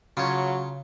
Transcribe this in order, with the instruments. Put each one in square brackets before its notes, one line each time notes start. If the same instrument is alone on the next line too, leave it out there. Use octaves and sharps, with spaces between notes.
[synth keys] C#3 [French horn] F#3 [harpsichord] F4 C#5